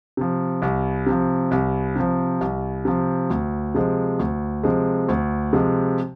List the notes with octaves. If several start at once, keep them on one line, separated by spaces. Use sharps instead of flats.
C3 F3
C2
C3 F3
C2
C3 F3
C2
C3 F3
D2
C3 F3 G#3
D2
C3 F3 G#3
D2
C3 F3 G#3